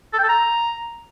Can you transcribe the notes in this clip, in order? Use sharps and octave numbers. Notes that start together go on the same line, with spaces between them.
A4
G5
A4
A#5